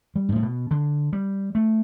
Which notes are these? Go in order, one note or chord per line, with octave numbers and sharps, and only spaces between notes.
G3
G2
A2
B2
D3
G3
A3